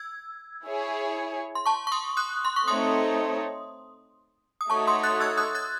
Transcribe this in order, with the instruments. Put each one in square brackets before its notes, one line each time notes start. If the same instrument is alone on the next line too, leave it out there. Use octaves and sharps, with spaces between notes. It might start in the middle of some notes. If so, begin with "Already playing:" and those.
Already playing: [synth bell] E6 G#6
[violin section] E4 G#4 C#5
[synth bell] C6
A5 C#6
C#6
C6 D#6
D#6 F#6
C6
C#6
[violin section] A3 C4 D#4 A4 C#5 [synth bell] C6 D#6
[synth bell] D#6
[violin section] A3 D#4 F#4 C#5 [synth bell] A5 C#6
[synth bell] C6 D#6
F#6 A6
E6 G#6
D#6 F#6
F#6 A6